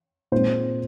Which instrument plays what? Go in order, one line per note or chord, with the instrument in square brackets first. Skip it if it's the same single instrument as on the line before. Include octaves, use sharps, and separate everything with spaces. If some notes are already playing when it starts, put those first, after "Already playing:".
[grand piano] A#2 G#3 C4 C5